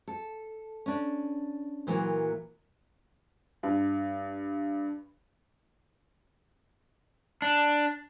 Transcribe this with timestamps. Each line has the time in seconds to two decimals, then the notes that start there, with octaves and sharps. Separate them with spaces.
0.08 A4
0.86 C#4 D4
1.87 A#2 E3 F#3 A#3
3.63 G2
7.42 D4